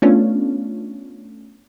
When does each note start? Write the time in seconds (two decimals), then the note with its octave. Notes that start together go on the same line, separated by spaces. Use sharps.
0.02 A3 B3 C#4 D4 F4